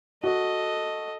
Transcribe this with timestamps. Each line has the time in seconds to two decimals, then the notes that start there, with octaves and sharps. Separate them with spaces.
0.24 F#4 A4 D#5